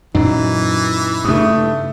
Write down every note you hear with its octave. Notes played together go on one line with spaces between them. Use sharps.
F#2 A#2 E3 F#3 D#4
G2 C#3 A3 D#6